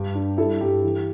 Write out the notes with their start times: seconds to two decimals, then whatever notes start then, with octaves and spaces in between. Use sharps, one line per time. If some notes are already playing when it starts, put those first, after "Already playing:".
Already playing: G2 G4
0.15 D4
0.37 G3 E4 A4
0.61 G2 G4
0.83 E3